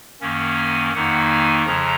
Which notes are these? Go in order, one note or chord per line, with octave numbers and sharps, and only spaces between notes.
F#2 D#3 A#3 C#4
G#5
F2 D#3 A#3 D#4 F#5
G#5
F2 C#3 F3 A#5